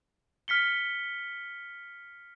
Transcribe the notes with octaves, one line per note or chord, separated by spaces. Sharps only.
F6 B6 C#7 G7